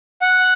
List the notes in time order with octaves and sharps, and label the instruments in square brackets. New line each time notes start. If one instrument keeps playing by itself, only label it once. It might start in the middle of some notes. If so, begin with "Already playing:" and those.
[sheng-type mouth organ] F#5